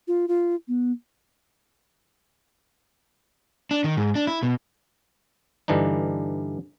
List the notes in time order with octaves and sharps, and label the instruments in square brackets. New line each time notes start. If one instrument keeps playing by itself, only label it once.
[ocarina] F4
F4
B3
[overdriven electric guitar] D4
D#3
G#2
D4
E4
B2
[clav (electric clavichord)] G2 D3 E3 D4 D#4